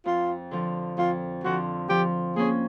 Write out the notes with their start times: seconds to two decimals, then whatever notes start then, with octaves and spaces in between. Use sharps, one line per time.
0.05 F2 F4
0.51 D3 F3
0.98 F2 F4
1.44 D3 F3 F#4
1.89 F3 G4
2.36 A#3 C#4 G#4